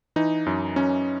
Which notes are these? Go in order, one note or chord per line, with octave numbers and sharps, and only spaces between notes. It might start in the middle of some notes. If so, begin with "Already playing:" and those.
E3 D#4
F#2
F#2 C#4